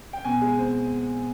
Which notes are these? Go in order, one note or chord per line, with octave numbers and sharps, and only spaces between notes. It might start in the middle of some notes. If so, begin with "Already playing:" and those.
G5
B2 G#5
G#3
C4